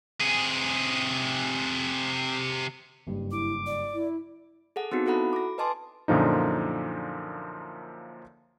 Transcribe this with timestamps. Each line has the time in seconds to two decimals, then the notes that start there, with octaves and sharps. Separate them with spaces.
0.20 C3 G#4
3.07 F#1 G2
3.31 E4 D6
3.66 D5
3.93 E4
4.76 G#4 A4 F#5
4.92 B3 C4 D#4 F#4
5.06 E4 F#4 A4 F#5 B5
5.33 D6 A#6
5.58 B4 D#5 G#5 A5 C6 D6
6.08 F#2 A#2 D3 F3 D#4